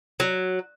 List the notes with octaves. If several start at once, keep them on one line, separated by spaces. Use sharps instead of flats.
F#3